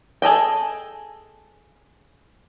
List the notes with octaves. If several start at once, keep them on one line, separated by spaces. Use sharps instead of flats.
G#4 A4 D#5 G5